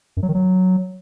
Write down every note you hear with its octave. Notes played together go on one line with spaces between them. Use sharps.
F#2
F#3
D#3
F#3